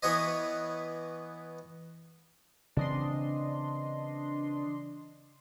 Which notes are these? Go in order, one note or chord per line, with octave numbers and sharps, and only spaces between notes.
E3 B3 B4 C#5 D#5
C#3 E3 C4 D4 D#5 C6